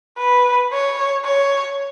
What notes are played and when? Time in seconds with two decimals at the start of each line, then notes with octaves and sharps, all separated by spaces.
0.18 B4
0.72 C#5
1.24 C#5